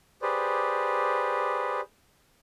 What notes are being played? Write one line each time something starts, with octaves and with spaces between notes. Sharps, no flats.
G4 G#4 B4 C5 D5